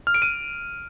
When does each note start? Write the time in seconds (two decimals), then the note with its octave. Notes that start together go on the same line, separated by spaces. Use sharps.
0.07 F6
0.14 D7
0.22 D#7